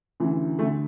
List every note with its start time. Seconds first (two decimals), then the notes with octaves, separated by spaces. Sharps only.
0.20 D2 C#3 E3
0.59 D2 D3 A3